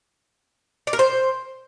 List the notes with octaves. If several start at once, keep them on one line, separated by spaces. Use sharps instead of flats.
D5
A#4
C5